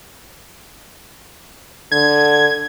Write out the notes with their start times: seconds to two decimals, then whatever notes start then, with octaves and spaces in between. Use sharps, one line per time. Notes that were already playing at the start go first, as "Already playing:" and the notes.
1.92 D3 G#6